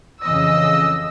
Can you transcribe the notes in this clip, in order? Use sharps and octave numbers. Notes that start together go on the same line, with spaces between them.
F2 C#3 E3 D#5 E6